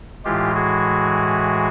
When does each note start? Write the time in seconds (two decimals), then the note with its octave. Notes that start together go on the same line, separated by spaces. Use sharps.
0.25 A2 E3 G#3 F4 G4
0.55 F#4 G#4